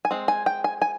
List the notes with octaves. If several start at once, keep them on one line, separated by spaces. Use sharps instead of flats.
G#5
G#3 C4
G#5
G5
G#5
G#5